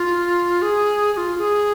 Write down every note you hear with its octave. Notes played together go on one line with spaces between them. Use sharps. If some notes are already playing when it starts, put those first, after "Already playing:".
Already playing: F4
G#4
G#4
F4
G#4